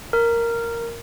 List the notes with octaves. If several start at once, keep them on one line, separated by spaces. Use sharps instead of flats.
A#4